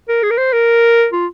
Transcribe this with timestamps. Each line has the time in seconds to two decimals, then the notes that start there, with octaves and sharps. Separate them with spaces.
0.08 A#4
0.23 G#4
0.31 A#4
0.38 C5
0.53 A#4
1.13 F4